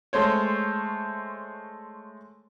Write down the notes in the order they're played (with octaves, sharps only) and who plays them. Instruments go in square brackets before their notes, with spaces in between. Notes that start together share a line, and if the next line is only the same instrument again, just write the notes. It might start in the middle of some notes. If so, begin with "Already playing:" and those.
[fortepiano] G#3 A3 C5 C#5